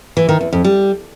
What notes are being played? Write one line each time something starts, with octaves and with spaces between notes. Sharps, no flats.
E3
D#3
E2
F2
G3